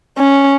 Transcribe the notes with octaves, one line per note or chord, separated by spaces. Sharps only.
C#4